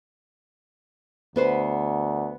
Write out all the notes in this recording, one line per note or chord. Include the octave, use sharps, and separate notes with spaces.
D2 B3 B4 C5